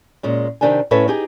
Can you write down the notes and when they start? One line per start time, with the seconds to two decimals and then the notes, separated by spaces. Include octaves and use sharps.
0.23 A#2 G#3 C#4
0.61 C3 D#3 D4 G4 G#5
0.91 A2 C#4 A4 B4 C#5 E5
1.08 D#4 G4 G#4